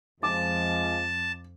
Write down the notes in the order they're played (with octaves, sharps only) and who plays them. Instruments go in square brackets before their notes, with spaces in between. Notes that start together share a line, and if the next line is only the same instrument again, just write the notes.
[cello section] F2 [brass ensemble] F3 G#3 [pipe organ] A5 [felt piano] D6